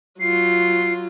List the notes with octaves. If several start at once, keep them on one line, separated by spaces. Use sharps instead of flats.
F#3 F4 C7